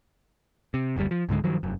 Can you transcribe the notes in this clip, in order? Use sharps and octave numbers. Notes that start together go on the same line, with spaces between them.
C3
F#1 D2 C#3 G3
F3
C#2 G#2 D3 G#3
G2 D#3 F3 F#3
F1 F#2